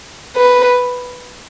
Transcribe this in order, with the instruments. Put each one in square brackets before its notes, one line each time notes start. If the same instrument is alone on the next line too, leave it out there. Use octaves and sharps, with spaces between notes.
[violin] B4